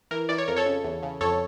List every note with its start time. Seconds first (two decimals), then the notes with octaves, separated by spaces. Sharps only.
0.11 E3 A#4
0.29 E3 D5
0.38 C#5
0.48 F2 A#4
0.56 A4 C#5
0.66 C#3
0.84 E2
1.03 C#3
1.21 F2 A4 C#5